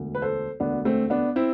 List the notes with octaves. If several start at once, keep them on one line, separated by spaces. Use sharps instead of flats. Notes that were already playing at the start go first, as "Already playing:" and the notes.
Already playing: E1 D2 D3
B4
A4 C5
E1 D2 D3 B3 D4
A3 C4
B3 D4
C4 E4